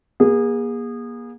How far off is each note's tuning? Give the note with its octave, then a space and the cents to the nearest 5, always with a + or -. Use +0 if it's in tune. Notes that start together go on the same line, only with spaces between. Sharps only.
A#3 +35 G#4 -25